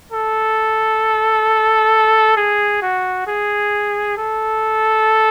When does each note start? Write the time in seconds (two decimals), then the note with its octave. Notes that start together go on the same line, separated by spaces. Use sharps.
0.12 A4
2.37 G#4
2.82 F#4
3.27 G#4
4.17 A4